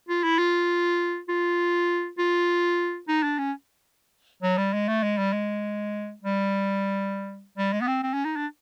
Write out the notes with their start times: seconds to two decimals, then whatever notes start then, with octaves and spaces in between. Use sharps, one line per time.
0.09 F4
0.23 E4
0.38 F4
1.29 F4
2.18 F4
3.08 D#4
3.23 D4
3.38 C#4
4.43 F#3
4.58 G3
4.73 G#3
4.88 A3
5.03 G#3
5.18 G3
5.33 G#3
6.22 G3
7.58 G3
7.73 G#3
7.81 B3
7.87 C4
8.03 C4
8.14 C#4
8.25 D#4
8.36 D4